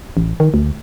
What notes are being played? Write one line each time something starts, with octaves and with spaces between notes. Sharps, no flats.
A1
D#3
D2